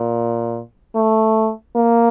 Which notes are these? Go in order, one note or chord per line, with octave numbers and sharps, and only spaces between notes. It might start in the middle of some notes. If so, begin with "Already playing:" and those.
Already playing: A#2
A3
A#3